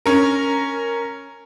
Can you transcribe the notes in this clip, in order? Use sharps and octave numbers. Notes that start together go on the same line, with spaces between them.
C#4 A#4